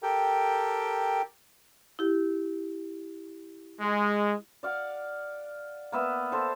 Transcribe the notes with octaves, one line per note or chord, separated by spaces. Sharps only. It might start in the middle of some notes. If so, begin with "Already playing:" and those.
G4 A4 A#4 G5
E4 G4
G#3
D5 F5 F#5
A#3 B3 E5
A4 C5 E5